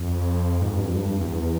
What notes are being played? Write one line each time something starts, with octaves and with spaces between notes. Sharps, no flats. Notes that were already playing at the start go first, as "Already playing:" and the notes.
Already playing: F2
G#2
G2
F2
G2
E2